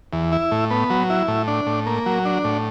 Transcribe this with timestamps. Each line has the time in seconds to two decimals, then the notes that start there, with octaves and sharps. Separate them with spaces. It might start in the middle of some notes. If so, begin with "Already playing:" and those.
0.13 E2
0.32 E4
0.51 A2
0.71 B3
0.90 F#3
1.10 E4
1.28 A2
1.48 D4
1.67 A2
1.86 A#3
2.06 F#3
2.25 D4
2.44 A2